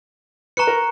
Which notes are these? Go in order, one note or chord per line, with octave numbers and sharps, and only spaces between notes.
B4 A#5 C#6 F#6 C#7
A#4